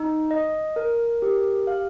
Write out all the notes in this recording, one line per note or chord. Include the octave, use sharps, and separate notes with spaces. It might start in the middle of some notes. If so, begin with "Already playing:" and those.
Already playing: D#4
D#5
A#4
G4
F5